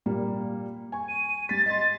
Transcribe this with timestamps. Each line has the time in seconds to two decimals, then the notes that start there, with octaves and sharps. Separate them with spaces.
0.06 A#2 G3 A#3
0.92 G#5 C#6
1.08 D#7
1.49 G3 A6 B6
1.66 D#5 C6 A6